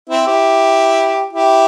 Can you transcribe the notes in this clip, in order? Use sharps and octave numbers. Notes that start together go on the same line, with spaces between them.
C4 E4
E4 G4
E4 G4